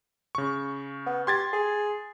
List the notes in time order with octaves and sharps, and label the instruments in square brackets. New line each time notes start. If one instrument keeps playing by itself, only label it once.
[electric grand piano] C#3 C#6
[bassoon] B3
[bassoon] G4 [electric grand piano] C6 G#6 A6
[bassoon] G#4